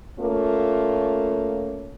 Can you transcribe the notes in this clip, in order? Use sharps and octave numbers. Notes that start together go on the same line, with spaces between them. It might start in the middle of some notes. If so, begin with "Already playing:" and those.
A3 A#3 C#4 F4